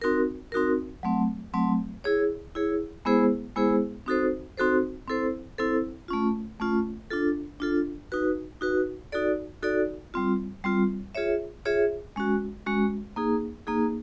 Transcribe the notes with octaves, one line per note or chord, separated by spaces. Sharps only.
C4 D#4 F#4 A#4
C4 D#4 F#4 A#4
F#3 A3 C4
F#3 A3 C4
E4 G#4 C#5
E4 G#4 C#5
G#3 B3 E4 G#4 C5
G#3 B3 E4 G#4 C5
C4 D#4 F#4 A4 C5
C4 D#4 F#4 A4 C5
C4 E4 A4 C5
C4 E4 A4 C5
A3 C#4 F4
A3 C#4 F4
D4 F4 A4
D4 F4 A4
D#4 F#4 B4
D#4 F#4 B4
D#4 F#4 A4 D5
D#4 F#4 A4 D5
G3 C4 F4
G3 C4 F4
F4 G#4 C#5 E5
F4 G#4 C#5 E5
G#3 C#4 F#4
G#3 C#4 F#4
A#3 D#4 G#4
A#3 D#4 G#4